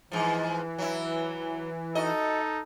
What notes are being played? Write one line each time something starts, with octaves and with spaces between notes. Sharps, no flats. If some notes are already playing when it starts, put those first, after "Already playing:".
G#2 E3 F3
F#3 E4
D#4 F#4 A4 D#5